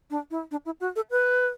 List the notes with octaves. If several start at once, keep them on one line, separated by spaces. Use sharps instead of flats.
D4
E4
D4
E4
F#4
A4
B4